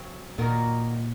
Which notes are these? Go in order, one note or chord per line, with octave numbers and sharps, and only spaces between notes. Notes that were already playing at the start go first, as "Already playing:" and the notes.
Already playing: C#3 F#3 C4
A#2 D#3 A#3 D#4 F#4 A#4